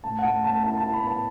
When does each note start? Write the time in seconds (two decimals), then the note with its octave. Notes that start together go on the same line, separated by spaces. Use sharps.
0.04 A2 A5
0.19 F#5
0.24 A2 A5
0.43 A2 A5
0.63 E4 A5
0.78 A5
0.83 E4
0.94 B5
1.03 B3 A5